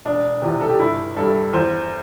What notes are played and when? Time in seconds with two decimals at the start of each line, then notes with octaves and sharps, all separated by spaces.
0.05 E1 D4
0.42 E2 C3
0.61 A4
0.69 G4
0.79 G1 E4
1.17 G2 G3 A4
1.53 E2 C5